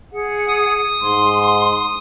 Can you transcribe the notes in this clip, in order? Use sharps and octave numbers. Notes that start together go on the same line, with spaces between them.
G#4 F#5
D#6
G#2 C6